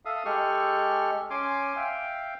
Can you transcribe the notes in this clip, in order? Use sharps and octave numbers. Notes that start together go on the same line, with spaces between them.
A4 E5 F5 D#6
G#3 G4 A4 C#6 F6
C#4 G#5 C6 D6
E5 F5 G5